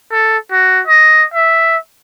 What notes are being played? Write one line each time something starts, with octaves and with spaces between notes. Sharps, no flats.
A4
F#4
D#5
E5